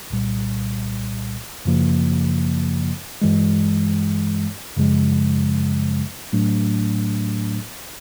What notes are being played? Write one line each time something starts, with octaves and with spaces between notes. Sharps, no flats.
C2 A#2 G3
F#2 C#3 F3 A#3
G2 E3 G#3
F#2 C#3 F3 G#3
A2 F#3 A3 D4